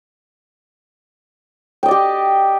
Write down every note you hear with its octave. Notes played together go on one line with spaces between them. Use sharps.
G4 D5 D#5 G5